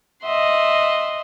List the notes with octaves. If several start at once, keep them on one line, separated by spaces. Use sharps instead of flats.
D#5 E5 F#5 C6